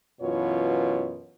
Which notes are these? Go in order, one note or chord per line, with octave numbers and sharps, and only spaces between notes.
F#2 B2 E3 F4 B4 C#5